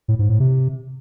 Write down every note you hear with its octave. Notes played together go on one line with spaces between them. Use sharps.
A2
G#2
A2
C3